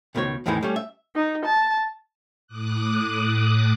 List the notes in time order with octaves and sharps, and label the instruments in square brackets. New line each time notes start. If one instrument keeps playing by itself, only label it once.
[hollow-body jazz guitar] C#2 B2 D#3 A#4 C#5
E2 A2 D#3 E3 G#3 E4
G3 A3 C#4
E5
[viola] D#4
A5
[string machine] A2 D6 D#6 F#6